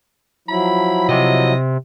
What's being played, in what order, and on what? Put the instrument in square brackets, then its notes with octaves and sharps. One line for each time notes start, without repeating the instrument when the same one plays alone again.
[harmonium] F3 F#3 E4 [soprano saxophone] B5
[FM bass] C3 [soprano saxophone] D#5